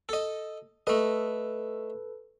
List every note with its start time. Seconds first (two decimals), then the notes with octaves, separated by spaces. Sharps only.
0.09 A4 D#5
0.87 A3 A4 B4 D#5